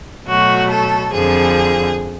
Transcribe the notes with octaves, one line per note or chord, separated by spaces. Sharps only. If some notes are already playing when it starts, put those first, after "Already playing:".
B2 F#3 A3 F#4
A4
F2 D3 F3 G#4